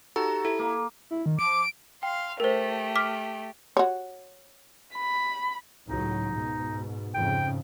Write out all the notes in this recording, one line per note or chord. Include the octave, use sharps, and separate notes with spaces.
D#4 F#4 G4 A4 A#5
E4 A4
A#3
E4
D#3
F3 D6 D7
F5 G5 C6
A3 G4 A#4 C5
D6 F6 B6
F#4 C#5
B5
C#2 A2 F#3 D#4
G#2 B2
F2 G#2 C#3 G5